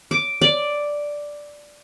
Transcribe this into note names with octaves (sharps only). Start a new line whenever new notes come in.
D6
D5